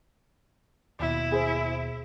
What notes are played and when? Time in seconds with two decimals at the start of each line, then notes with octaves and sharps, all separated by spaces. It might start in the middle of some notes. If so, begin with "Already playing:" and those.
1.00 D#2 B2 E4
1.31 G#4 C5